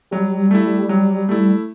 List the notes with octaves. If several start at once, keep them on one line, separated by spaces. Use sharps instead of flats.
F#3 G3
A3 E4
F#3
A3 E4